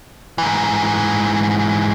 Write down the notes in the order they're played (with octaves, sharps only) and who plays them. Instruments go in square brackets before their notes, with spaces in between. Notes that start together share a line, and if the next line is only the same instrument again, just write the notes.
[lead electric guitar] G#2 E3